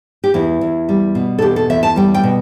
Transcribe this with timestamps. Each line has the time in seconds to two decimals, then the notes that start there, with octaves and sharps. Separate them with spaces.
0.24 G4
0.34 E2 E4
0.61 E2
0.89 G3
1.15 B2
1.39 A4
1.42 E2 G4
1.56 A4
1.70 E2 E5
1.83 A5
1.96 G3 G5
2.14 G5
2.24 B2